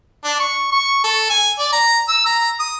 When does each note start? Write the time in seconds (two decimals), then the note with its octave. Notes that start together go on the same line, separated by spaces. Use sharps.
0.24 D4
0.40 C#6
0.71 C#6
1.04 A4
1.30 G#5
1.59 D5
1.73 A#5
2.08 E6
2.26 A#5
2.60 D#6